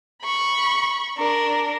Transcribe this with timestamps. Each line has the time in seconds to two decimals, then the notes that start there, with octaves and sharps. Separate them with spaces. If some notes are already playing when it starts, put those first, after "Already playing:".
0.23 B5 C#6
1.18 D4 A#4